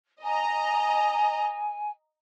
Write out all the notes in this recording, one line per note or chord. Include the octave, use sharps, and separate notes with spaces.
D#5 G#5 A#5